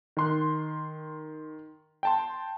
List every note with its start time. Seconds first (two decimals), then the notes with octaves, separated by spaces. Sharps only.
0.17 D#3 C6 F#6
2.03 G5 A5 C6